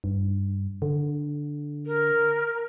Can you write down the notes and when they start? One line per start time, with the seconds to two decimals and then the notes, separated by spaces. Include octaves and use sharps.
0.04 G2
0.82 D3
1.86 A#4